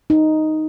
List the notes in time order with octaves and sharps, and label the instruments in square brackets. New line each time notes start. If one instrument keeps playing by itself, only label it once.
[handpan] D#4